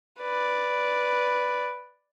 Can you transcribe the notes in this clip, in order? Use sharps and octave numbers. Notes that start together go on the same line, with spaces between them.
B4 D5